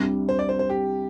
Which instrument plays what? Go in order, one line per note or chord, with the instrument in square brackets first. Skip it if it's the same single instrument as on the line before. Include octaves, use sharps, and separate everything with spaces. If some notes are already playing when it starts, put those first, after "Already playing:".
Already playing: [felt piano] C2 C3 G3 D4
[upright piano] C5
D5
C5
C5
G4